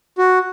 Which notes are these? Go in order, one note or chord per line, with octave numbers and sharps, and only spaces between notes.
F#4